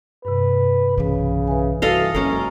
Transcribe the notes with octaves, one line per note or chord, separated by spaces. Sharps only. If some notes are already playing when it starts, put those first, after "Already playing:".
G2 C3 B4
B1 C#3 E3
B4 E5 G#5
E3 G3 F#4 A4 D#5 F5
F#2 G#3 A#3 C#4 A#4 F5